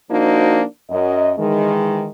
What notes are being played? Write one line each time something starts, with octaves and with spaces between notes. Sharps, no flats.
F3 A#3 D4 D#4 F#4 C5
F#2 D#5
D#3 E3 G#3